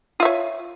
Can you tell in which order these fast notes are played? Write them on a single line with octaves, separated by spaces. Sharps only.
F4 E5 C#5